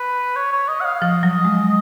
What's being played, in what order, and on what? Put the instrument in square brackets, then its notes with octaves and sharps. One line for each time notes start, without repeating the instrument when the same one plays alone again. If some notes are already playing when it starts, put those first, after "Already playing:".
Already playing: [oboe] B4
C#5
C#5
D#5
F#5
F5
[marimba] F3 [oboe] D#5
[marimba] F#3
G#3